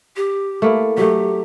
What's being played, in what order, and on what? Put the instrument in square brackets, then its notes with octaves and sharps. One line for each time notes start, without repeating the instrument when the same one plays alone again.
[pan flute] G4
[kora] A3 A#3 E4
[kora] F#3 A3 [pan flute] G4